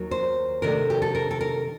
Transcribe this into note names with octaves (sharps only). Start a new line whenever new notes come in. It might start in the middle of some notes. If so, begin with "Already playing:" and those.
Already playing: D#2 D#3 F#3
C5
C3 D#3 A3 D4 A#4
G4
A4
A#4
A4
A#4